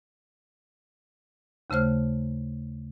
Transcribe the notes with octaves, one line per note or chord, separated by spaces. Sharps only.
D#2 C#3 A3 C5 F6